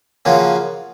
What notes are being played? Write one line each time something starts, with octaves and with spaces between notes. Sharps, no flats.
C#3 F3 A#3 C#4 F#4